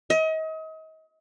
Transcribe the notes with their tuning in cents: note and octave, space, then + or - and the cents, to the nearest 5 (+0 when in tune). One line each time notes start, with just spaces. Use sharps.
D#5 +35